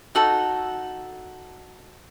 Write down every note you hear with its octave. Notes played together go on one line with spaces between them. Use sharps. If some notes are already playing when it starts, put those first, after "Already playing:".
D#4 F#4 A4